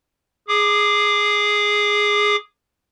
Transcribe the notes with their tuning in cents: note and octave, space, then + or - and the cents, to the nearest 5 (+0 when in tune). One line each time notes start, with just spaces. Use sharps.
G#4 +0 D6 +20